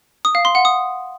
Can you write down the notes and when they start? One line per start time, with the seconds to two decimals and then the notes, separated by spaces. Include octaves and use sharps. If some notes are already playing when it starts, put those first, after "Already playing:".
0.25 D#6
0.35 F5
0.45 C6
0.55 F#5
0.65 D#6